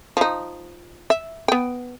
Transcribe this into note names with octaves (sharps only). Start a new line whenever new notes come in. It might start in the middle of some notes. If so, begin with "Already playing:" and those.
F3 D#4
E5
B3 G5